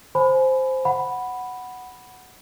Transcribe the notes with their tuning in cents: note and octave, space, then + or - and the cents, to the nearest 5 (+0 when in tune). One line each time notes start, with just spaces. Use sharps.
C5 +0 G#5 +25 B5 +15
F#5 +0 B5 +0